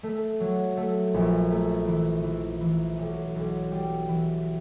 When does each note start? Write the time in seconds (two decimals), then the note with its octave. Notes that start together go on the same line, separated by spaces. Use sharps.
0.03 A3
0.40 F#3
0.77 A3
1.14 A#1
1.51 A3
1.87 E3
2.24 E3
2.61 E3
2.98 B1
3.36 B1
3.71 G3
4.09 E3